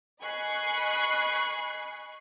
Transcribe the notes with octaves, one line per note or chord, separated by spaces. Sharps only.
D#5 G#5 B5 C#6 F#6 C7